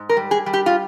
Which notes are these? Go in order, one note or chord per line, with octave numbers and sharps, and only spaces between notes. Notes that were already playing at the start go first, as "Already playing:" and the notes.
Already playing: G#2
A#4
G3
G#4
G3
G4
F4